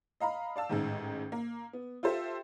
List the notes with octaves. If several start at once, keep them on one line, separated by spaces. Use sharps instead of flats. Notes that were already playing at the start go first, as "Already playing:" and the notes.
D#5 F5 A#5 B5
D5 F5 A5 E6
A1 G#2 D#3
A#3
B3
F4 G4 A4 C5 E5